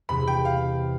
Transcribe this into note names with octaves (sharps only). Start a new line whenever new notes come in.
E2 C3 E3 B5
G5
F5